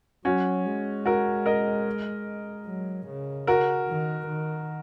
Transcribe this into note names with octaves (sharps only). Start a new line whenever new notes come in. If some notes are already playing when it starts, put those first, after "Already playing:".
F#3 C#4 F#4
G#3
F#4 A#4
A#4 D#5
F#3
C#3
F#4 A#4
D#3
D#3